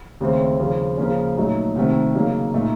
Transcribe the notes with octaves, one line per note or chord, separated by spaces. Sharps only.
D#2 C#3 A3 C4
D#2 C#3 F3
C#3 F3 A#3 C#4
A#2 F#3 A3 D#4
C2 C3 D#3 A3 C4
C#3 F#3 A#3 D#4
A#2 A3 D#4